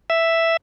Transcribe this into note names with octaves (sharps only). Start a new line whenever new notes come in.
E5